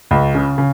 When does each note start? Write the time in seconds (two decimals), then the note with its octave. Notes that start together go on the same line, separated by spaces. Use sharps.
0.11 C#2
0.35 C#3
0.58 C#3